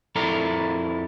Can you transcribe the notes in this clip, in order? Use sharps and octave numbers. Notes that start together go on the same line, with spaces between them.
F2 E4 A4 A#4 D5 A#5